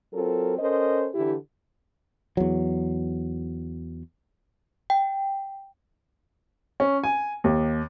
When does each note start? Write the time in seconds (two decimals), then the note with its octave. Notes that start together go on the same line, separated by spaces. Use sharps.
0.13 F#3 C4 F4 A4 A#4
0.59 C#4 A4 A#4 C5 D#5
1.14 D3 E3 E4 G4
2.37 E2 F#3
4.90 G5
6.80 C#4
7.04 G#5
7.44 D#2